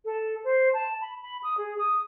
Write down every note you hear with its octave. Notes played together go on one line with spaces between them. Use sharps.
A4
C5
A5
B5
B5
D#6
G#4
D#6